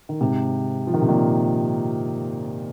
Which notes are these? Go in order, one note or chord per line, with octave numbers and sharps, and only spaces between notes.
D#3
G#2 C3
F3
D#3
C3
A#2 D#3